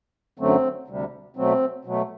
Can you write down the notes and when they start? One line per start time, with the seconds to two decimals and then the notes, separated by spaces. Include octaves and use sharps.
0.39 F#2 D3 F#3 A3 C4
0.88 D2 C3 G3
1.36 B2 F#3 A3 C4
1.85 B2 F#3 A3